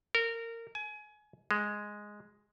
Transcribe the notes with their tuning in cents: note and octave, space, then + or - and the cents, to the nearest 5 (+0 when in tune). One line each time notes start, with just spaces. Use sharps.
A#4 -20
G#5 +25
G#3 +0